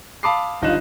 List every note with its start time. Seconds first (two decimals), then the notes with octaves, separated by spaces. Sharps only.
0.23 F5 A5 B5 D6 D#6 C7
0.62 G1 G2 D#4 F4 F#6 E7